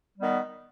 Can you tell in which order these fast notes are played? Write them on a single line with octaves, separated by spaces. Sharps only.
G3 D#3 B3